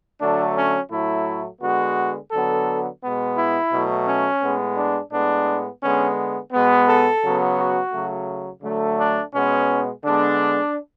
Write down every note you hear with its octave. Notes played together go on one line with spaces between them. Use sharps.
D3 F#3 A3 D4
C#4
A2 F#3 A3 E4
D3 G#3 B3 F#4
D3 F#3 B3 A4
B2 G#3 B3
E4
B2 F#3 A3
C#4
A2 G#3 B3
D4
A2 G#3 B3 D4
D3 G#3 B3 C#4
B2 G#3 B3
A4
C#3 F#3 B3
F#4
C#3 F#3 A3
D3 F#3 A3
D4
B2 G#3 B3 C#4
D3 G#3 B3 D4